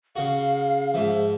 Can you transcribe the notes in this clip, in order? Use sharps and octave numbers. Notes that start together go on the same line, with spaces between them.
C#3 F#4 F5
G#2 F3 E5